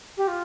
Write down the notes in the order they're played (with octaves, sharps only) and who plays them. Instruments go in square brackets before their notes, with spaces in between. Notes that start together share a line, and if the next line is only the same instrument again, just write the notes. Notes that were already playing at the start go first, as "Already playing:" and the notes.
[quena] G4
F4